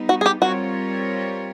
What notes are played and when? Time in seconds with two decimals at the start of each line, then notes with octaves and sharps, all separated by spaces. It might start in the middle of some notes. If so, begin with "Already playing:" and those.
Already playing: G3 B3 D#4
0.09 F#4
0.21 G#4
0.26 G4
0.42 G3 C4 F4 F#4 A#4 C#5